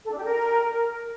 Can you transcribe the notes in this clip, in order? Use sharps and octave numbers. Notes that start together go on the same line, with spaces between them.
A4
D4
G4
A#4